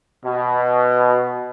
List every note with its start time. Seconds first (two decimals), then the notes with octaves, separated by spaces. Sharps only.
0.24 B2